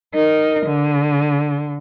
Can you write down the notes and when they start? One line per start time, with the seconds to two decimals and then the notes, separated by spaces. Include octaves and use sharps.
0.15 D#4 A#4
0.66 D3